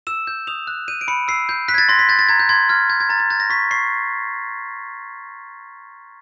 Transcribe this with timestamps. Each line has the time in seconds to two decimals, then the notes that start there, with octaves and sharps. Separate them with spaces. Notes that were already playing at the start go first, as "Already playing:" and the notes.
0.07 E6 E7
0.27 G6
0.47 D#6 F7
0.67 F#6
0.88 G6 D#7
1.01 D7
1.08 B5 C#7
1.28 E6 C7
1.49 G6
1.68 F#6 B6
1.74 G#6
1.78 A6
1.89 C6 A#6
1.99 B6
2.09 G6 A6
2.19 A6
2.29 A#5 G#6
2.40 G6
2.49 C6 G#6
2.69 F6 G#6
2.90 G6 G#6
3.00 G#6
3.09 A#5 A6
3.20 A6
3.30 G6 A6
3.40 A#6
3.50 C#6 B6
3.71 C#6 C7